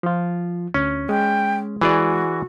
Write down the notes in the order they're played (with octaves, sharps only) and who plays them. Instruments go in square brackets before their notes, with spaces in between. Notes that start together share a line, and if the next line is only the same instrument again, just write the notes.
[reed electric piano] F3 F4
[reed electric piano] D2 [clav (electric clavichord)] C#4
[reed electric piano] G#3 [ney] G5
[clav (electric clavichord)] E3 G#4 D5 [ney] F#4